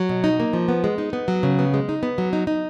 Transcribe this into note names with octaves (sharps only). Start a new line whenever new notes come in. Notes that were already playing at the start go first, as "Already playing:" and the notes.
Already playing: F#3
B2
D#4
A#3
F3
B3
G#3
D#4
B3
F#3
C#3
B3
G#3
D#4
B3
F#3
D#4
D#4